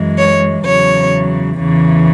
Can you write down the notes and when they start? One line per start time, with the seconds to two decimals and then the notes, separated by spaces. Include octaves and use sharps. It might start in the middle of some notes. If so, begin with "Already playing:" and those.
Already playing: F#2 E3 G#3
0.18 C#5
0.65 E2 C#3 F#3 C#5
1.59 E2 C#3 E3